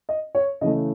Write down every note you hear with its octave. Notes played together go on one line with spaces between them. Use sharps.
D#5
C#5
C#3 E3 A3 D#5